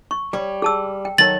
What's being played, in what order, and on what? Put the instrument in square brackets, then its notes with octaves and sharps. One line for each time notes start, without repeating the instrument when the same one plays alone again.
[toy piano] C#6
[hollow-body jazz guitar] G3 C#5
[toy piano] G#4 A5 E6
G5
[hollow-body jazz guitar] D#3 F#3 A4 [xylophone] A6 F#7